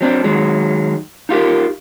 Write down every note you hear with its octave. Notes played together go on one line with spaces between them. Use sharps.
F#3 C4 D4
D#3 F#3 G#3
D#4 F4 G4 A#4